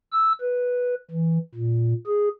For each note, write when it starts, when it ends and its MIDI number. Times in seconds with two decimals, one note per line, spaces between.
0.12 0.33 88
0.41 0.95 71
1.10 1.38 52
1.54 1.93 46
2.07 2.29 68